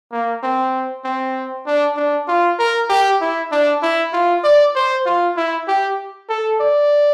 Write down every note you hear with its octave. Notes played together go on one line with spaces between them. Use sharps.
A#3
C4
C4
D4
D4
F4
A#4
G4
E4
D4
E4
F4
D5
C5
F4
E4
G4
A4
D5